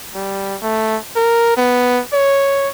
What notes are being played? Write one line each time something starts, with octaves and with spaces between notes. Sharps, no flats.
G3
A3
A#4
B3
C#5